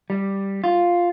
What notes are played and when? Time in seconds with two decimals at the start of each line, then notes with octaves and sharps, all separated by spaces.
0.10 G3
0.64 F4